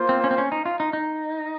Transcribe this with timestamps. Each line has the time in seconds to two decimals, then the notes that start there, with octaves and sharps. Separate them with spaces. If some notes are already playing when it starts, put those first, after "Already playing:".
Already playing: A#3 F4 C5
0.09 C4
0.24 C#4
0.31 C4
0.38 C#4
0.52 D#4
0.66 F4
0.80 D#4
0.93 D#4